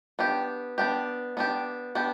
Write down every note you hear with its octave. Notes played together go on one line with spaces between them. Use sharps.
B3 D4 G4
B3 D4 G4
B3 D4 G4
B3 D4 G4